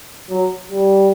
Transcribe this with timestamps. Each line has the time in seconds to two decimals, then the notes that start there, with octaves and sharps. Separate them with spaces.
0.30 F#3
0.71 G3